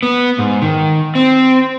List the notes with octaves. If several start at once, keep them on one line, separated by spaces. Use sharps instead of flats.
B3
G#2
D#3
C4